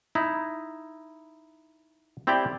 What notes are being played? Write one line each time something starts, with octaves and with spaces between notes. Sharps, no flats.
D#4 E4
C4 E4 G4 D5 G5